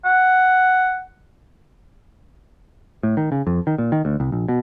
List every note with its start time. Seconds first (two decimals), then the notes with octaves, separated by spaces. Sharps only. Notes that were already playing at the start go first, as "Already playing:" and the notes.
0.05 F#5
3.03 A2
3.17 D#3
3.32 C#3
3.47 F2
3.67 D#3
3.78 A#2
3.92 D#3
4.05 D2
4.20 C2
4.32 A#1
4.48 B2